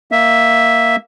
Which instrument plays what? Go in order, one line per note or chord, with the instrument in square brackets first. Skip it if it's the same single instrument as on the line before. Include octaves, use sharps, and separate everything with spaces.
[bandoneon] A#3 E5